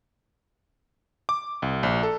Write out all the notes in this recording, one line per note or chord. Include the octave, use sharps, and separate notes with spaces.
D6
C2
A#1
A4